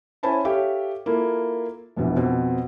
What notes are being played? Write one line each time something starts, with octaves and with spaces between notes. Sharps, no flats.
C#4 E4 C5 G#5 A5 B5
G4 A4 C#5 E5 F5
A#3 E4 F4 A4
F1 A#1 F2 B2 E3
F2 B2 C4